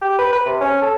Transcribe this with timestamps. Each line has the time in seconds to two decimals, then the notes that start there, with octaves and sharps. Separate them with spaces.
0.01 G4
0.18 B4
0.32 B4
0.46 C3
0.61 C#4
0.82 A4